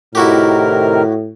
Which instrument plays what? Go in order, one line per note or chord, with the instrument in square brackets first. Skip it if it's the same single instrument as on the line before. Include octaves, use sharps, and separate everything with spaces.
[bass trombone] A2 [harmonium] C3 D#3 A#4 [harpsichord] E4 F#4 G4